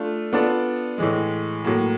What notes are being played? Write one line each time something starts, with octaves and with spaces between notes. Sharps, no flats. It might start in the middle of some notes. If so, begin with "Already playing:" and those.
Already playing: A3 D4 F4
B3 D4 F4 A4 D5
A2 E3 G#3
A2 F#3 A#3